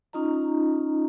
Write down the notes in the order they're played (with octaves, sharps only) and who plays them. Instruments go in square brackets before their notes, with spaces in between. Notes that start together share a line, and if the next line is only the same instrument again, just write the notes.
[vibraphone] C#4 D#4 F4 D#5 A#5